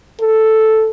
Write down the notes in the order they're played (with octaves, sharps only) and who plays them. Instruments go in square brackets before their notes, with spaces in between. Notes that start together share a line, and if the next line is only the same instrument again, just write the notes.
[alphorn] A4